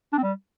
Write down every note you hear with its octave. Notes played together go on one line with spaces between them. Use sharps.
D4
C4
G3